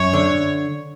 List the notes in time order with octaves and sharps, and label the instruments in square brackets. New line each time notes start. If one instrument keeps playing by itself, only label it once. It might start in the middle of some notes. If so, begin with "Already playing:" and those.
Already playing: [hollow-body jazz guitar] F#2 [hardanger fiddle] C#5
[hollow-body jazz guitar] D3